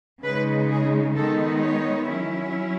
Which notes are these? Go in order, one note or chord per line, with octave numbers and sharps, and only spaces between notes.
C#3 G#3 D#4 B4
G#4
D#3 G#3 B3 D#4 A4
C#5
F#3 C#4 E4